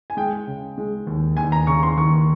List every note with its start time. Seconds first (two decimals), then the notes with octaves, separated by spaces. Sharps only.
0.10 G#5
0.17 G#3 G5
0.47 C#3
0.78 G#3
1.07 D#2
1.37 D#2 G#5
1.52 A#5
1.67 C#3 C#6
1.83 C6
1.97 D#2 C#6